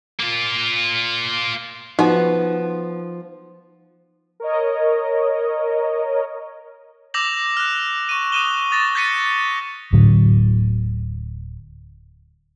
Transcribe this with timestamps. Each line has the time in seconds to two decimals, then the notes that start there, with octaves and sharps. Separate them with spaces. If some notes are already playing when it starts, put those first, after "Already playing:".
0.20 A#3 F4
1.99 F3 B3 D#4 F#4
4.40 A#4 C#5 D#5
7.14 D6 E6 G6 A#6 F7 F#7
7.57 F6 F#6
8.09 C#6 D#7
8.32 D#6 F#6 D#7 E7 G7
8.71 D#6 A6 A#6 D#7
8.95 G6 A6 B6 C#7 D#7
9.93 D1 A2 D3 F#3